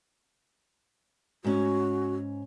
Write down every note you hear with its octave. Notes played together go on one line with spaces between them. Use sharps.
G#2 C#4 F#4